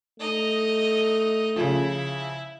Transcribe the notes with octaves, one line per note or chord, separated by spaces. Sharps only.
A3 D#4 D#5
C#3 F3 E4